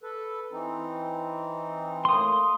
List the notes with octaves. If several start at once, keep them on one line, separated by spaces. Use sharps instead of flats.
A4 B4
E3 C4 D#4
A2 A#3 C6 D#6